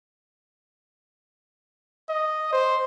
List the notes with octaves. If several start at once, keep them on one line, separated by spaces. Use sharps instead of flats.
D#5
C5